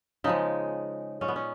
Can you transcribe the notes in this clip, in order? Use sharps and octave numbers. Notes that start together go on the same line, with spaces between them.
C#3 F3 G#3 D#4
A#2 G#3 C#4
B3
C#4